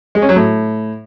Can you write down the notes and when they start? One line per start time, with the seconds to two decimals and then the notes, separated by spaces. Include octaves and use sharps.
0.15 G#3
0.22 C#4
0.29 F#3
0.36 A2